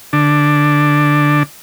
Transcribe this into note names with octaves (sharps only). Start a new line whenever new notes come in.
D3 D4